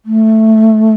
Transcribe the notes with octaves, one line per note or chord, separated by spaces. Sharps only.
A3